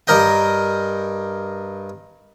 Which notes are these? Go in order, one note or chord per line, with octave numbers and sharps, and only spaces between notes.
G2 A#4 D#5 G5